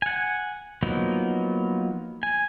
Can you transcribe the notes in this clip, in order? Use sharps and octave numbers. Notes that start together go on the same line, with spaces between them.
F#5 G#5
F3 F#3 A#3 B3 D#4
G#5